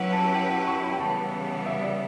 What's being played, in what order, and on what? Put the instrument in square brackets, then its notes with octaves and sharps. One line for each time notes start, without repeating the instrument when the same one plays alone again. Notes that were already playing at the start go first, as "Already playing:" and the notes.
Already playing: [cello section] F#3 C#4 E4 G4 B4 [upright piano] F#5
[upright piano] A5
G5
F#5
C#6
B5
G5
[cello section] C#3 E3 G3 B3 [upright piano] A5
[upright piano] E5
D5